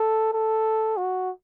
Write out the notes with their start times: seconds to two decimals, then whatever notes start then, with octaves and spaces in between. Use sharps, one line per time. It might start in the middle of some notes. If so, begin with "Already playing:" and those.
Already playing: A4
0.33 A4
0.97 F#4